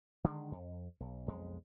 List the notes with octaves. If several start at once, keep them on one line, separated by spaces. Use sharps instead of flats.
D3 D#3 G#3
F2
B1
B1 F2 G#3